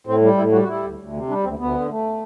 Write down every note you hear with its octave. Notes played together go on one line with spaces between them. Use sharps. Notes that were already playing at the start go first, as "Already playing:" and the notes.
A2 C4
G3
A2 E4
G3 F#4
F#4
G3 E4
D2
D2
C3
G3 D4
D2 C4
D2 B3
D3
A3